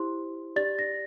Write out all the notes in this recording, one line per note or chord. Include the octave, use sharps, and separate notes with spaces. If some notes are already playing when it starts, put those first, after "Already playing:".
Already playing: E4 G4 C5 C6
G4 D5 A6
A#6